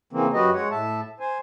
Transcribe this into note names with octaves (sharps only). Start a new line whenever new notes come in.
C#3 E3 A#3 C4
F#2 F#3 F#4 G4 B4 D#5
G#3 C#5 F#5
A2 E5 A5
C5 G#5